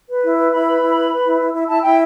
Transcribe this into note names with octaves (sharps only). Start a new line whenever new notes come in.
B4
E4
B4
E4 B5
B4
E4
B4
B4
E4
E4
E4
E4 A5
E4 G5